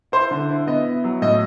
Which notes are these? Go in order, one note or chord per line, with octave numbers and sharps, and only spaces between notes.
E4 C5
D3
E4
B3 D#5
E4
F#3
A2 D#5